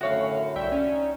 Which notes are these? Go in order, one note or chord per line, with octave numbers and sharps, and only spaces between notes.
F#2 A2 D3 F#4 C#5 E5 F5
C2 D5 E5 G5
C#4
D#4